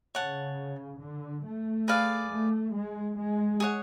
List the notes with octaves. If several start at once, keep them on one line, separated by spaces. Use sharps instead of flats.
C#3 C#5 F#5 A5
D3
A3
G#4 B4 D5 F5
A3
G#3
G#3
G#4 C#5 F#5